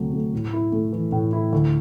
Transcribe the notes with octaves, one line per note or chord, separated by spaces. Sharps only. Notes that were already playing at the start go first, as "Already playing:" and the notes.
Already playing: D2 C3 F#3 A3
A3
A2
E4
A3
E3
A2
E4
D2